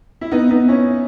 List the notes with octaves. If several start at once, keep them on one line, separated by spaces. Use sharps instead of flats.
E4
B3 D#4
B3 D#4
C#4 E4